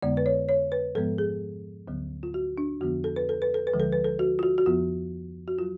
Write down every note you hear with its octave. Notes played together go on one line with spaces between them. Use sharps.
F2 D3 G#3 B3 D5
B4
C#5
C#5
B4
G#2 F3 G#3 B3 A4
G#4
D2 D3 F#3 B3
F4
F#4
D4
F2 D3 F3 B3 F#4
A4
B4
A4
B4
A4
B4
D2 D3 F3 G#3
A4
B4
A4
F#4
F4
F#4
F#4
F2 F3 B3 F4
F#4
F#3 F4